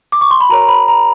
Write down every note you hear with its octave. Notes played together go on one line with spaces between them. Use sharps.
D6
C#6
C6
B5
F#4 A#4 C#5 A#5
B5
A#5